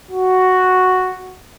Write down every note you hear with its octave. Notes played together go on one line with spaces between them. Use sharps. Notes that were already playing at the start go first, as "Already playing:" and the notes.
F#4